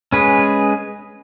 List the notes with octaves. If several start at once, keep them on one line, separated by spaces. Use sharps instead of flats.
G#3 C#4 G#4 B4